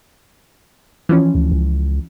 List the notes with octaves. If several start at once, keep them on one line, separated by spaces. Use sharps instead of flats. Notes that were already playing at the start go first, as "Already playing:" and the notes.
E3 F3 C#4
D2
C#2